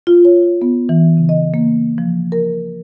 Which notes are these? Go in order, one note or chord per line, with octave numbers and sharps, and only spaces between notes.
F4
C#5
B3
E3
C#3
D#5
A#3
F3
A#4